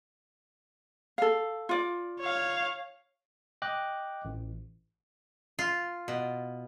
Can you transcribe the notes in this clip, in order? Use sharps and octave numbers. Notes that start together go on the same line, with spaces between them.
A4 F5
F4 D5
C#5 F5
D#5 G5 D6 F#6
A1
F4
B2